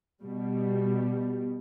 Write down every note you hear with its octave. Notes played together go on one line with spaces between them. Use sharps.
B2 G3